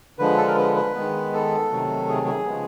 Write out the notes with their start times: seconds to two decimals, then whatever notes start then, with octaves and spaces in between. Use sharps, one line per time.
0.19 D3 F3 G#3 B4
0.37 A4
0.47 A#4
0.57 B4
0.75 B4
0.94 D#3 G#3 B3
1.33 A4
1.71 C3 D#3 F#3 A3
2.09 G#4
2.27 G#4
2.46 C#3 F3 G#3 B3